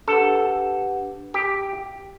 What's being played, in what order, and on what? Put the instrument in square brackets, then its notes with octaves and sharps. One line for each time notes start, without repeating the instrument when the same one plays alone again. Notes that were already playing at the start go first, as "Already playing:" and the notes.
[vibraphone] D4 G4 B4 F#5 [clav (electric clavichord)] A4
[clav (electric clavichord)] G4